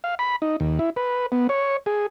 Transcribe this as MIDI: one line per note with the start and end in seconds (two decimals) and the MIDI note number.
0.04 0.15 77
0.19 0.36 83
0.42 0.56 63
0.60 0.79 39
0.79 0.90 64
0.96 1.26 71
1.32 1.47 59
1.49 1.77 73
1.86 2.06 68